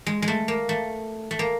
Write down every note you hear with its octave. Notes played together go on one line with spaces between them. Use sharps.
G#3
G#3
A3
A#3
A3
A3
A#3